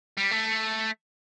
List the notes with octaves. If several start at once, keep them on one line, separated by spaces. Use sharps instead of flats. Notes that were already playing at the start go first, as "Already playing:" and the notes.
G3
A3